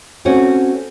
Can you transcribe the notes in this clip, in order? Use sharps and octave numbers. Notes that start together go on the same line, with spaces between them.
A3 C4 C#4 F#4